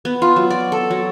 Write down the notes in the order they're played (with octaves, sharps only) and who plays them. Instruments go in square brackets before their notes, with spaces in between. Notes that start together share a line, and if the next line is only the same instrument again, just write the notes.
[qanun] B3
F4
F#3
D5
A4
F#3